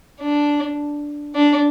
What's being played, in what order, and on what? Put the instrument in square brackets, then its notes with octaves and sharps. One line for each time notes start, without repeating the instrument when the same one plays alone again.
[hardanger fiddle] D4
D4